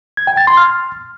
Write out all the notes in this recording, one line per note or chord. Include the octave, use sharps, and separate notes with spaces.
G#6
G5
A6
C6
F6